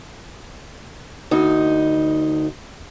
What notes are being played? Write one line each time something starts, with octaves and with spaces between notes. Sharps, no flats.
D2 D#4